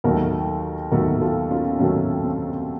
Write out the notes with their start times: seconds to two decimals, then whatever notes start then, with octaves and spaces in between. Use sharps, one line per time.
0.04 D#2 D#3 F#3 A3 F#4 A#4
0.92 D#2 D#3 F#3 A3 F#4 A#4
1.21 F4 A4
1.51 C#4 F4
1.79 D#2 D#3 F#3 A3 C#4
2.24 C4